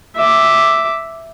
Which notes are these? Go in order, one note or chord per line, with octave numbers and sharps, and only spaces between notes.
E5 D6